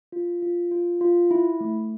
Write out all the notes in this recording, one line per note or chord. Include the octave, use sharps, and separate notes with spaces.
F4
F4
F4
F4
E4
A3